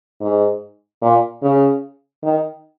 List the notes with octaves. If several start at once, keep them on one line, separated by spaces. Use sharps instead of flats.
G#2
A#2
C#3
D#3